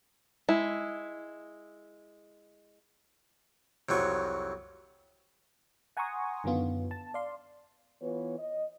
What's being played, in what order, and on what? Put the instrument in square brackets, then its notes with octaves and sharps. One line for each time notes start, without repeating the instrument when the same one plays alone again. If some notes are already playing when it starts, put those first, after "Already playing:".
[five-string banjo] G#3 E4
[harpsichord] C2 F2 F#3 C#6
[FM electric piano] F#5 G#5 A#5 C6 C#6 D#6
F#2 D3 D#3 F#3 B3 F4
A5
D5 F5 C6
[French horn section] E3 B3 F4 B4 C#5
D#5